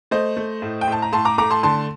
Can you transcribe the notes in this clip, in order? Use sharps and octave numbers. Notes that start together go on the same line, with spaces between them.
A3 C5 D#5
A3
A2
G5
A2 A5
A#5
A2 A5 C6
A#5 D6
A3 A#5 D6
A5 C6
D3 A5 C6